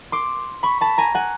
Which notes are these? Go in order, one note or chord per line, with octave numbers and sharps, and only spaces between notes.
C6 D6
B5 C#6
A5 B5
G#5 A#5
F#5 G#5